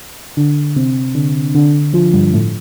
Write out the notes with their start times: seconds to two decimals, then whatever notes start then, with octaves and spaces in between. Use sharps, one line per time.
0.37 D3 D4
0.76 C3 C4
1.15 D3 D4
1.55 D3 D4
1.93 F3 F4
2.13 G2 G3
2.33 A2 A3